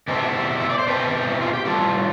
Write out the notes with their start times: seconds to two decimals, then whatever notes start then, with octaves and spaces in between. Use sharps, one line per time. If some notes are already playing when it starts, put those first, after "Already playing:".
0.08 B2 A3 C4 E4 G4
0.60 E5
0.69 D5
0.78 C5
0.87 B2 A3 C4 G4 B4
1.28 E4
1.41 F4
1.53 G4
1.65 A2 G3 B3 F4 A4